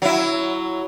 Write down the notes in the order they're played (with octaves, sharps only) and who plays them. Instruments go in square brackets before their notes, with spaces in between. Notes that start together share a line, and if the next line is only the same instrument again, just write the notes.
[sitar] F#3 E4